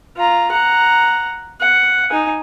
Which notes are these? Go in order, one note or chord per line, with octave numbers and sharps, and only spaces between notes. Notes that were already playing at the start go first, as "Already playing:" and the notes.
F4 A#5
F#5 A#5
F#5
D#4 G#5